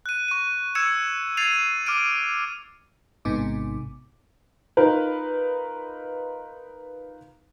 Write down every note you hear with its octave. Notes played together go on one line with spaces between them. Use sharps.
F#6 D#7
C#6 D#7
E6 G#6 C#7 E7
G#6 A6 C7 D#7 F7
C7
D6 F6 D7 D#7
A1 G#2 C3 B3 D#4 D6
D#4 F4 A#4 B4